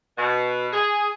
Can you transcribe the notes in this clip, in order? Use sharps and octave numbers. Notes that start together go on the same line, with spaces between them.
B2
G#4